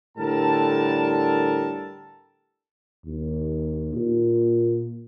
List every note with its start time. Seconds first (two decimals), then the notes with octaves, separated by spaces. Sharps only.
0.17 A2 D3 G3 A4 A#4 A5
3.06 D#2
3.95 A#2